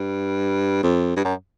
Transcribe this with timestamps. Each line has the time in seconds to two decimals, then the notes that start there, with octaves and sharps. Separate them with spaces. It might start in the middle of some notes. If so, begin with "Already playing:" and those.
Already playing: G2
0.83 F2
1.17 G2
1.25 F#2